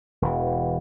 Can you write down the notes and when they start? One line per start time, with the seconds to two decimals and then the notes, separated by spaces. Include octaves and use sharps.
0.22 E1 E3